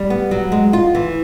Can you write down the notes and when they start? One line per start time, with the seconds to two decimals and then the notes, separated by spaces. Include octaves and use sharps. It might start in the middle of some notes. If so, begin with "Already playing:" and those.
Already playing: G3
0.10 B3
0.31 F#3
0.52 G#3
0.73 F4
0.95 E3